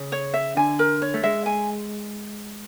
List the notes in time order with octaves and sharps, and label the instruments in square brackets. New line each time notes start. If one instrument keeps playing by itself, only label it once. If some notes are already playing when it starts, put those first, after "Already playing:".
Already playing: [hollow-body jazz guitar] C#3
[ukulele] C#5
E5
[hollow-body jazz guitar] D3 [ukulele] G#5
[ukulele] A#4
C#5
[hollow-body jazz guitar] A3
[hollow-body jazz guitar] G#3 [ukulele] E5
[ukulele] G#5